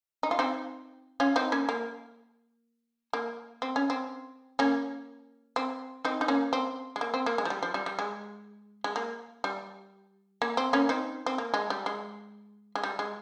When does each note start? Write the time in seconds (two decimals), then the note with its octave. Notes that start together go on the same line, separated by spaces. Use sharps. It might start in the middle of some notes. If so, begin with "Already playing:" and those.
0.23 D#4
0.31 F4
0.39 C4 D#4
1.20 C#4 F4
1.36 C4 D#4
1.52 A#3 C#4
1.69 A#3
3.13 A#3
3.62 C4
3.76 C#4
3.90 C4
4.59 A#3 C#4
5.56 C4
6.05 C4 D#4
6.21 D#4
6.28 A#3 C#4
6.53 C4
6.96 G#3
7.01 A#3
7.14 C4
7.26 A#3
7.38 G#3
7.45 F3
7.50 G3
7.63 F3
7.74 G3
7.86 G3
7.99 G#3
8.84 G#3
8.96 A#3
9.44 G3
10.42 A#3
10.57 C4
10.73 A#3 C#4
10.89 C4 D#4
11.26 C4
11.38 A#3
11.54 G#3
11.70 G3
11.86 G#3
12.75 G#3
12.84 G3
12.99 G#3